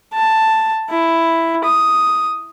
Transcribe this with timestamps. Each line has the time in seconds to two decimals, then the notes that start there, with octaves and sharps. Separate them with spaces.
0.13 A5
0.90 E4
1.64 D#6